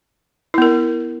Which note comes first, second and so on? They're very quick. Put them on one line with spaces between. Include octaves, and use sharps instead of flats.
E4 B3 A#4